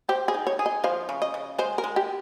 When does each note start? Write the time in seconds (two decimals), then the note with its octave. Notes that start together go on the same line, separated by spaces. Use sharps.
0.09 G4 C5
0.28 G#4
0.34 D#4
0.47 C#5
0.59 G#4
0.66 D#5
0.84 F3 F5
1.09 C#3
1.22 D#5
1.34 C#3
1.58 G#3 C5
1.78 A#4
1.84 G#3
1.96 G4